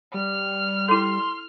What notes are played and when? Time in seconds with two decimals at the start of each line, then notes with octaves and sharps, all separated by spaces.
0.14 G3 F6
0.88 E4 A4 C6